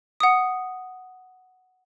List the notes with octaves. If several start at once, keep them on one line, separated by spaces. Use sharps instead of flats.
F#5 D#6